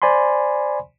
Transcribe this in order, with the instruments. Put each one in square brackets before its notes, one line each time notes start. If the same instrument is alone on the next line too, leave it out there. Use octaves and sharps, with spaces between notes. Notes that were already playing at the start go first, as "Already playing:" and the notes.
[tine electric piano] C5 D5 G#5 B5 C6